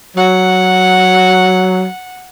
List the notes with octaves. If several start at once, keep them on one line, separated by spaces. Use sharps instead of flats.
F#3 F#5